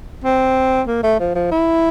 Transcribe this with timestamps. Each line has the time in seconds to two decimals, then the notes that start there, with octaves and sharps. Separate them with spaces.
0.24 C4
0.87 A#3
1.04 A3
1.20 F3
1.35 F3
1.51 E4